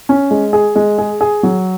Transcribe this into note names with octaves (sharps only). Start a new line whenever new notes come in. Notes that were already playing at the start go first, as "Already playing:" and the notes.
C#4
G#3
G#4
G#3
G#4
G#4
F#3